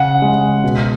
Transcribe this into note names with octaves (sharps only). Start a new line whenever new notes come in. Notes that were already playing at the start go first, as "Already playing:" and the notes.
Already playing: C#3 F#5
G#3
B2